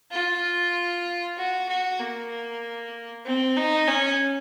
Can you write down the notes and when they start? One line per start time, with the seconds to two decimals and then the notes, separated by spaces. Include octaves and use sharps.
0.12 F4
1.37 F#4
1.68 F#4
1.99 A#3
3.25 C4
3.56 D#4
3.87 C#4